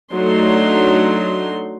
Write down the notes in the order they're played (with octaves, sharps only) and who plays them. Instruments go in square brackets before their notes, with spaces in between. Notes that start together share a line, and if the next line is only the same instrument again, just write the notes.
[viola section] F#3 A3 D4 D#4 C6